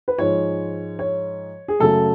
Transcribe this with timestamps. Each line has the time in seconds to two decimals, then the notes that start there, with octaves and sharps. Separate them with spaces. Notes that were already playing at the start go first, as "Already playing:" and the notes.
0.08 B4
0.18 G#2 F3 G#3 C#5
0.99 C#5
1.68 G#4
1.80 F#2 C#3 F#3 A3 A4